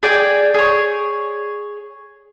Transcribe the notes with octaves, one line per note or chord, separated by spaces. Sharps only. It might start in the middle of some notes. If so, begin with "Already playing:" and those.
G#4 D5 G5 G#5
G#4 C#5